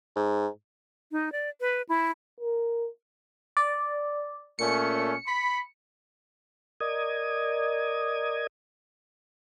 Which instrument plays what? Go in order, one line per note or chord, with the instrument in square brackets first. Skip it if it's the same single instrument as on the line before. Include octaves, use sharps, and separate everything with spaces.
[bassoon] G#2
[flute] D#4
D5
B4
E4
[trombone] A#4
[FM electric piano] D5
[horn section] A#2 A3 C#4 [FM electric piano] C#7
[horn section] B5
[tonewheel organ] A#4 D5 D#5 D#6 G#6